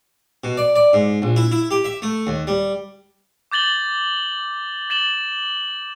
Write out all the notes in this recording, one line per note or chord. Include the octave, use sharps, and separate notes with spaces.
B2
D5
D5
G#2
A#1
E4
E4
G4
E5
A3
D#2
G3
D6 G6 A6 F#7 G7
A6 E7 F#7 G7